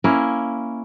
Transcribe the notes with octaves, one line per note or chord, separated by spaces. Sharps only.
A#3 C#4 E4